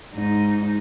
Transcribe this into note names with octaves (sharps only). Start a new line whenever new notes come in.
G#2 D#4